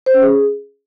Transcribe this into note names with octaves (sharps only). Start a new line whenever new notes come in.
C5
C#4
G#4